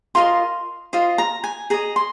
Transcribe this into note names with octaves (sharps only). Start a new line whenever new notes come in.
F4 A#4 D#5 C6
F4 C5 D#5
A#5
G#5
G#4 D#5 A#5
C6